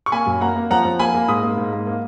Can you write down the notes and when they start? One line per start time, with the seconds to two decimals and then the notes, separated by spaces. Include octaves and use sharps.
0.06 C#6
0.12 A#3 G#5 B5
0.26 F#2
0.41 A#3 F#5 A#5
0.56 A#3
0.71 F3 F#5 A#5
0.85 F3
0.99 A#3 G#5 B5
1.14 A#3
1.28 G#2 B5 D#6
1.43 A#3
1.57 G#2
1.73 A#3
1.87 A#3